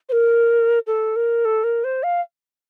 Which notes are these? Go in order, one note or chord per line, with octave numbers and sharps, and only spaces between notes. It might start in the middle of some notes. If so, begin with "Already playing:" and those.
C5
A#4
A4
A#4
A4
A#4
C5
F5